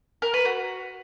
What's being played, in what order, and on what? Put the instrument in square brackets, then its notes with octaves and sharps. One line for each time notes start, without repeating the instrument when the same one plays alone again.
[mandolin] A#4
B4
F#4